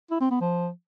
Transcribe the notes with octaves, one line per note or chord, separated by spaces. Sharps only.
E4
C4
B3
F3